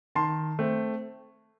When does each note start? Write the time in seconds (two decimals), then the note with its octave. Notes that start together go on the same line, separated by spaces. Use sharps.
0.15 D#3 A5 C6
0.59 A3 C4